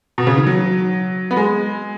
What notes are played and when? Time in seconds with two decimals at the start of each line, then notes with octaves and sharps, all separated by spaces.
0.18 B2
0.27 C#3
0.37 D#3
0.47 F#3
1.31 B3
1.37 G#3